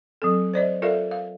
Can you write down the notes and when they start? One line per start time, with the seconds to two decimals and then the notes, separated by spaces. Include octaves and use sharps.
0.22 F#3 C4 A4
0.54 C5 D5 D#5
0.82 F4 A4 A#4 D5 E5 F5
1.11 F5